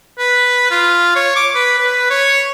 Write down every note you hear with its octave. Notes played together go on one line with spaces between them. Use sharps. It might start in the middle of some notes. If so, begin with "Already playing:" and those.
B4
F4
C#5
D6
B4
B4
C#5